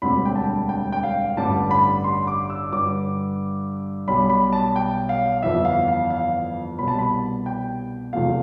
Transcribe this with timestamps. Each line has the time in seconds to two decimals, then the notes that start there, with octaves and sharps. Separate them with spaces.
0.02 E1 D2 D3 G3 C4 B5
0.25 G5
0.36 A5
0.69 G5
0.92 G5
1.03 F5
1.37 A1 G2 D3 G3 A5
1.71 B5
2.04 C6
2.27 D6
2.50 E6
2.72 G2 D3 G3 D6
4.07 B1 B2 G3 B3 B5
4.30 B5
4.53 A5
4.76 G5
5.09 F5
5.43 G1 F2 E3 B3 E5
5.65 F5
5.88 F5
6.10 F5
6.78 C2 B2 G3 B3 B5
6.88 A5
6.99 B5
7.46 G5
8.13 E2 C3 F3 A3 F5